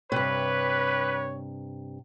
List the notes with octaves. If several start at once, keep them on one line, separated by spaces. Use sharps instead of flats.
G2 C3 G4 B4 C#5